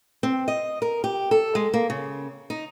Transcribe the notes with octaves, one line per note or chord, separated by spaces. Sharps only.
C4
D#5
A#4
G4
A4
G#3
A#3
C#3
D#4